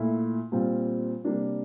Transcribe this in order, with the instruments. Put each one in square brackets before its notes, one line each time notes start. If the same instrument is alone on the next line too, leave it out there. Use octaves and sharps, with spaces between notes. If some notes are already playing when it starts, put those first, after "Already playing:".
Already playing: [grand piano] A#2 A3 E4
A#2 G3 C4 F4
C3 G3 A#3 D4